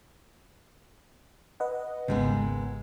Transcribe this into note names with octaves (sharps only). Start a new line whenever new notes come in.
B4 D#5 F#5
G#1 D#2 G#2 C#3 G#3 B3